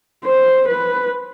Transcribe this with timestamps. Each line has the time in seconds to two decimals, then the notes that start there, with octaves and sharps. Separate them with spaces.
0.25 C5
0.68 B4